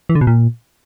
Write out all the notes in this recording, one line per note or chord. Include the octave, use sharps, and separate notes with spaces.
E3
D3
B2
A#2